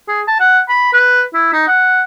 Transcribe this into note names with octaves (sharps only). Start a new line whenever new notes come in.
G#4
A5
F#5
B5
B4
E4
D#4
F#5